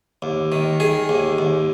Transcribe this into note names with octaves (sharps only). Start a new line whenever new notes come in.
D#2
D#3
D#3 G#4
D#2
D#2